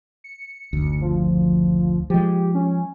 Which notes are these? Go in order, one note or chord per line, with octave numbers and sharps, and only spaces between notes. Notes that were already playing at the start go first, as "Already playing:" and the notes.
C#7
F#1 D2
F3
F3 G#3 G4
C#4